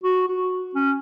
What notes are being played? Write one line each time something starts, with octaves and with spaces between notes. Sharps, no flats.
F#4
F#4
C#4